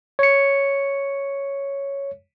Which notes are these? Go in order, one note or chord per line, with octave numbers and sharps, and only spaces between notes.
C#5 C#7